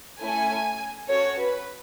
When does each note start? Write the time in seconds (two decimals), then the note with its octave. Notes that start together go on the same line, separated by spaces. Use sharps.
0.21 A3 C#4 E4 A4 G#5
1.08 C#4 F#4 A4 C#5
1.38 B4